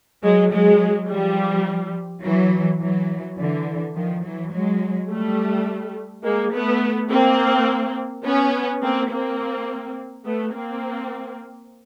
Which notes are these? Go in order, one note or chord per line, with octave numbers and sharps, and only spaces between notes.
F#3 G#3
F#3 G#3
F3 G3
E3 F#3
E3 F#3
D3 E3
D#3 F3
E3 F#3
F#3 G#3
G3 A3
G#3 A#3
A3 B3
A#3 C4
B3 C#4
A#3 C4
A#3 C4
A3 B3
A#3 C4